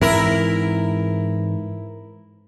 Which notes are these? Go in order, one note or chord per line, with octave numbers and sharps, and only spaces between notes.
G#2 E3 C4 E4 A#4